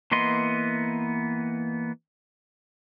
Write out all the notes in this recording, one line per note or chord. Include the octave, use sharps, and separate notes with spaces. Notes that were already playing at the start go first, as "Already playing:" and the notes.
E3 A#3 B3 D#5 C6